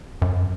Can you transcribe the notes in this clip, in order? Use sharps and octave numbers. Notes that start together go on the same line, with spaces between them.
F#2